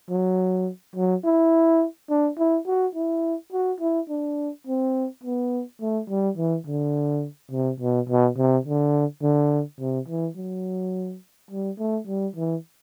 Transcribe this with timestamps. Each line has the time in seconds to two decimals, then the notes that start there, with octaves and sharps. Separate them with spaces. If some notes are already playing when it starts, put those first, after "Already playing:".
0.10 F#3
0.96 F#3
1.25 E4
2.10 D4
2.38 E4
2.67 F#4
2.95 E4
3.52 F#4
3.80 E4
4.09 D4
4.67 C4
5.23 B3
5.81 A3
6.10 G3
6.37 E3
6.67 D3
7.51 C3
7.80 B2
8.09 B2
8.37 C3
8.66 D3
9.22 D3
9.80 C3
10.08 E3
10.37 F#3
11.51 G3
11.79 A3
12.07 G3
12.36 E3